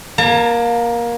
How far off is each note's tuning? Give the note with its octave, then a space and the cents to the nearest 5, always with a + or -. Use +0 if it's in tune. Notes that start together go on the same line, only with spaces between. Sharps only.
A#3 +20 A#5 -45